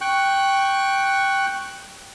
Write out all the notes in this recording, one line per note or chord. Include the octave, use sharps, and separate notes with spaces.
G5 C#6 F#6